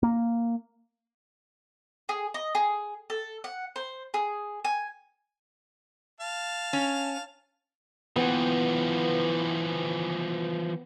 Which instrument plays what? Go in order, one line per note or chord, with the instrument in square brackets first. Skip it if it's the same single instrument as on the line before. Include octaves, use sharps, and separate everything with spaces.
[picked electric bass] A#3
[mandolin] G#4
D#5
G#4
A4
F#5
C5
G#4
G#5
[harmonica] F5 A5
[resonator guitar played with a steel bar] C#4
[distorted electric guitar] E3 F3 [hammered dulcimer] B3 G5